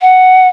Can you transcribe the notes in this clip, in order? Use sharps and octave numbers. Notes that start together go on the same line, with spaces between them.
F#5